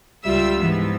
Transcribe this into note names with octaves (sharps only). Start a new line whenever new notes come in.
C#2 G3 F4 E5 E6
G#2 E3 F3 B3